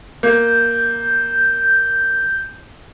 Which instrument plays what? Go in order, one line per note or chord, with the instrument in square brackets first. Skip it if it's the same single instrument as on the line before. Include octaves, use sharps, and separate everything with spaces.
[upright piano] A#3 [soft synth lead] G6